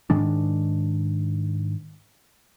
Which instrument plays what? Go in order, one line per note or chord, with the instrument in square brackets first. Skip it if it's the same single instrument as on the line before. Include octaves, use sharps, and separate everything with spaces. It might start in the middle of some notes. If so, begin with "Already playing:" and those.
[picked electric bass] G#2 D#3 G#3 D4